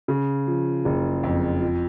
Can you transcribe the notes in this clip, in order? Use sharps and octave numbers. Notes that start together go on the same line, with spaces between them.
C#3
F3
F#1
F2
F3